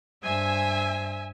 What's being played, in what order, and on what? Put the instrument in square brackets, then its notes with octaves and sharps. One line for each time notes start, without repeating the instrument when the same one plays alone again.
[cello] G2 C5 [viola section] E5 G#5